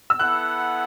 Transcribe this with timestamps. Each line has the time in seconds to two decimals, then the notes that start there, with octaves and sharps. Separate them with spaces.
0.10 E6
0.19 B3 E4 A4 F#5 F#6